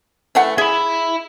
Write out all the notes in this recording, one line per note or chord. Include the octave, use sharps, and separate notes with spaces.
E3 A3 F#5
G#4 E5 B5